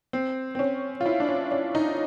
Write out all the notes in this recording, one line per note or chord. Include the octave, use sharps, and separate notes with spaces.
C4
C4
C#4
F4
E4
D4
C#4
C#4
D#4